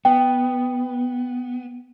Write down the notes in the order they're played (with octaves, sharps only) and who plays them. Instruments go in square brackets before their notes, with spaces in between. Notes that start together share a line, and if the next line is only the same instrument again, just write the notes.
[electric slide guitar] B3 [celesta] G5